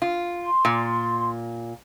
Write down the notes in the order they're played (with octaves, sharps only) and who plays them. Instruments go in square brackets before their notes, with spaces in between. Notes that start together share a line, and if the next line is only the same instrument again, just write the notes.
[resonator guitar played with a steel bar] F4
[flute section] C6
[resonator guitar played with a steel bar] A#2